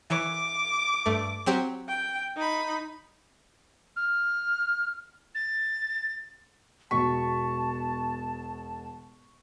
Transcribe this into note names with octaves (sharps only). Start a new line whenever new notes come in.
E3 C#5 D6
G2 A3
F#3 C4 G4
G5
D#4 B5
F6
A6
E1 B2 A5 C#6 B6